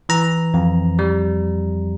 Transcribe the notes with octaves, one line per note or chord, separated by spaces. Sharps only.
E3 A#5
F2
G3